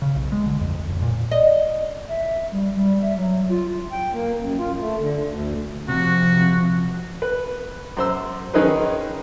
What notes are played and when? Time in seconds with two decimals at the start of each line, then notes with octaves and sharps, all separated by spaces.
0.02 C#3
0.16 B1
0.32 G#3
0.46 D3
0.61 F2
0.74 F2
0.90 E1
1.02 A#2
1.31 D#5
2.08 E5
2.52 G3
2.76 G3
3.03 E5
3.17 F#3
3.49 F4
3.92 G5
4.13 A#3
4.41 F#2
4.59 F4
4.80 A3
4.99 D3
5.26 D2
5.88 C3 F3 F#4
7.22 B4
7.97 F#2 C5 E6
8.54 D#3 C#4 D#4 G#4 B4 C5